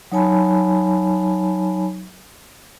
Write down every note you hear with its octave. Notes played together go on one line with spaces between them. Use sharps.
F#3 D#4 C#5 G#5 A5 B5